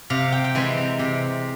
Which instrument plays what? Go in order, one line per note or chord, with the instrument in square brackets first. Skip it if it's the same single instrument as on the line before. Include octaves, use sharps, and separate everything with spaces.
[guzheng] C3 F5
G5
G5
E3 G#3 C4 G#5
A#5
C3